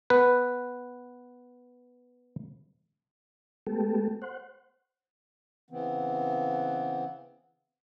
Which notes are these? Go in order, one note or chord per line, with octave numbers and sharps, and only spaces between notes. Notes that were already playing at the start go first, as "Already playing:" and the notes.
B3 B4
G#3 A3 B3 G4 A4
C5 F#5
C#3 E3 B3 C4